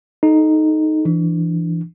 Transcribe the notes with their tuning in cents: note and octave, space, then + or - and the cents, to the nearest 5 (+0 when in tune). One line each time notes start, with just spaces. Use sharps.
D#4 +0 A4 -30
E3 +20 D4 +15